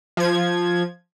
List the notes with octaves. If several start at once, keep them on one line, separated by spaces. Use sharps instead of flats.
F3 G#6